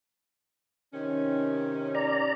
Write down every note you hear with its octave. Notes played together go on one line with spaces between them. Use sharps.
C3 D#3 C#4
D5 A#5